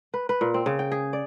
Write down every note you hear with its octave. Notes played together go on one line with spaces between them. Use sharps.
B4
B4
A#2
C4
C#3
G5
G#4
D5